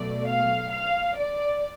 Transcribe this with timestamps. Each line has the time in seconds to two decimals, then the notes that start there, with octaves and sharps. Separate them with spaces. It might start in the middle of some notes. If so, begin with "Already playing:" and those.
Already playing: B2 F#3 A3 D5
0.27 F5
0.72 F5
1.17 D5